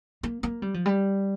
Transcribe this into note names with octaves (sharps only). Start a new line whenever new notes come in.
A#3
A#3
G3
F3
G3